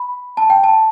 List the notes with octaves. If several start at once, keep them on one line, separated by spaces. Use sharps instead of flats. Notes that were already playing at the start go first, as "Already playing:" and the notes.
Already playing: B5
A5
G5
A5